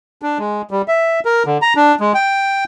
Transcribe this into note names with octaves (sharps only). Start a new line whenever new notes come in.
D4
G#3
G3
E5
A#4
D3
A#5
D4
G#3
G5